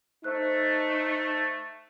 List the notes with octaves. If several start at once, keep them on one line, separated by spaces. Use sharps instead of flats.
A3 D#4 C5 F#6